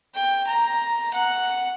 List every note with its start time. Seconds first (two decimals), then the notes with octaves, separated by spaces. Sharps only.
0.15 G5
0.47 A#5
1.14 F#5